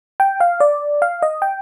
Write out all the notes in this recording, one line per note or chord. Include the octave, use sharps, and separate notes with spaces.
G5
F5
D5
F5
D#5
G5